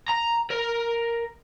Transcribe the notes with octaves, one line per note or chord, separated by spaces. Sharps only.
A#5
A#4